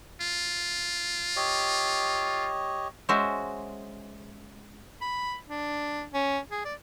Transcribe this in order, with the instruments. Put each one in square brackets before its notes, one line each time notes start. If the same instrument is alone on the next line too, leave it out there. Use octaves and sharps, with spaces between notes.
[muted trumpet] F4
[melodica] G4 C#5 D#5
[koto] G#3 C#4 F#4 C5 E5
[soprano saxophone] B5
D4
C#4
G#4
D5